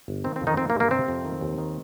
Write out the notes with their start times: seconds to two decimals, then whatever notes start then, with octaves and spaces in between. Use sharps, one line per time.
0.08 G1
0.24 D#3 C4
0.36 C4
0.41 F2
0.47 D#3 D#4
0.57 D#3 C4
0.70 A#3
0.75 G2
0.80 A#3
0.91 C3 C4
1.09 F2
1.25 D#3
1.41 D#2
1.58 D#3